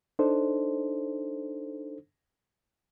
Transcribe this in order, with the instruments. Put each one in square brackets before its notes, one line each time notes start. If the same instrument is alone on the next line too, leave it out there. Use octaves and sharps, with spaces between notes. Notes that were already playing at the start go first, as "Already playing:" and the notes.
[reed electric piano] D4 D#4 A4 C5